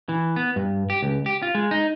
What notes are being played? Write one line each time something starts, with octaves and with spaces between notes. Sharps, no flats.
E3
B3
G2
G4
C#2
G4
F4
G#3
D#4